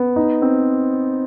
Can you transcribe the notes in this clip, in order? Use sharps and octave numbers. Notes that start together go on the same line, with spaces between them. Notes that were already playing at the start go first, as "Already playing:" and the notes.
Already playing: B3
D#4
C4